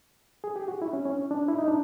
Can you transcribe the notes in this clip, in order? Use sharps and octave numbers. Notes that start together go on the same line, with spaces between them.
G#4
G4
F#4
E4
C#4
C#4
D4
E4
D#4
D4